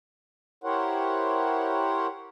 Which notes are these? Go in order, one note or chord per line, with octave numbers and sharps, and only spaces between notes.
E4 G4 A#4 C5 C#5 F#5